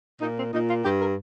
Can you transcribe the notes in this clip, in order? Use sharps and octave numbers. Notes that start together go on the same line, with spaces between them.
A#2 D#4
C4
A#2 D#4
F4
G2 G4
A#4